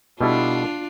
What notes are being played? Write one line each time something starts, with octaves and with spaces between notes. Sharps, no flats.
B2 G3 B3 D4 E4 F4 A4